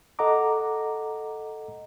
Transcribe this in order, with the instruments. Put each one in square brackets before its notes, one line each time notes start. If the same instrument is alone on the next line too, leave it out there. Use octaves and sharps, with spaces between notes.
[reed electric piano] A4 D#5 F#5 A#5 D6